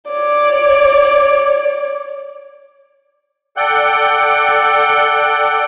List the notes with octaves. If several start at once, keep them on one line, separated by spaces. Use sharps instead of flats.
C#5 D5
A4 D5 F#5 G5 F#6 G6